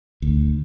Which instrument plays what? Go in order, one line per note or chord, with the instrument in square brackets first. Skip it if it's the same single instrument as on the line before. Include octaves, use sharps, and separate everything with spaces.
[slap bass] D2